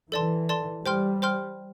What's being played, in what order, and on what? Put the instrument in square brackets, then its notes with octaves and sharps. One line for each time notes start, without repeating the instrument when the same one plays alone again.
[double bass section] E3 [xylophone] A4 D5 A5 C6
[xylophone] A4 D5 A5 C6
[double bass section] G3 [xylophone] C5 G5 C6 F6
[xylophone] C5 G5 C6 F6